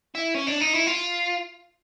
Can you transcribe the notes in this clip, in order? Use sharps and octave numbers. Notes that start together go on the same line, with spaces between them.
E4
C#4
D4
D#4
E4
F4